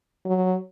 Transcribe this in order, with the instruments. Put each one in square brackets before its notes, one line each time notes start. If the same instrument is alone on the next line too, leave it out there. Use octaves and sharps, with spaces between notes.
[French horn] F#3